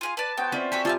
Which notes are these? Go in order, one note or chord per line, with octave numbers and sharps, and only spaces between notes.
F4 G#4 F5
B4 D5 A5
B3 F#4 C5 G5
C4 C#4 F4 C5 D5 E5
F#4 G4 A4 G#5 B6
C3 G3 F4 G#4 E5 F5 A5